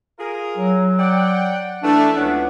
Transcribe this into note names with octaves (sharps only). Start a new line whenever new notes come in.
F4 G#4 A#4
F#3
D5 F#5 G5
E3 A3 D4
C#2 B3 C#4 D4 B4 F#5